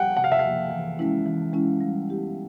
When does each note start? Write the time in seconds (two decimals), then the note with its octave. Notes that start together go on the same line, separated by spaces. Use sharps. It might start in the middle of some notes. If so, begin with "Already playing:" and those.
Already playing: F#5 G5
0.17 C3 F#5
0.24 F5
0.32 E5
0.39 F5
0.44 F3 A#3
0.71 E3
0.99 G#3 C#4 E4
1.26 E3
1.53 G#3 C#4 E4
1.81 G3
2.09 B3 E4 G4